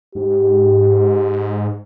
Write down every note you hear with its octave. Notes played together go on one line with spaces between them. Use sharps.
G#2 G4